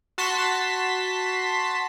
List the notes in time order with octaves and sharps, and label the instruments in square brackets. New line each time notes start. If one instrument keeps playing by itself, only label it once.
[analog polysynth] F#4 A5 C6 B6